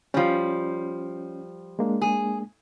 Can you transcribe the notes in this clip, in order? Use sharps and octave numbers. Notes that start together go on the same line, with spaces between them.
F3 G3 C#4
G#3 A#3 D4
G#4